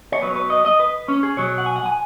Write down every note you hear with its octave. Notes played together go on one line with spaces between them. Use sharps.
C#5
B1 B2 F#3 B4
C#5
B4
D#5
D#5
B4
C#4
G#4
B1 B2 F#3 C#5
F#5
G#5
F#5
G#5